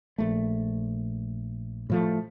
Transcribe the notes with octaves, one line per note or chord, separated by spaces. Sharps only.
A#1 A3
A2 F3 A3